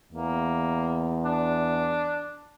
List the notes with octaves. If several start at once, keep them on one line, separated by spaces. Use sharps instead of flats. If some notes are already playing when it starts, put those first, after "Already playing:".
E2 A#3
D4